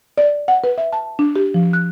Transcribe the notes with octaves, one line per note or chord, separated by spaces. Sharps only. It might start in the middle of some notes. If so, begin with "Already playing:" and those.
D5
F#5
B4
E5
A5
D4
G4
F3
F#6